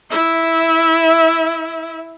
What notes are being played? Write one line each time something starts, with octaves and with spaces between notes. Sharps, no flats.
E4 E5